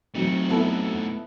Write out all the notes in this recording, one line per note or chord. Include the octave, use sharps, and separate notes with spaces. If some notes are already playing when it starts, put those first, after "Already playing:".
E3 F#3 A3 C4 D#4
B3 E4 A4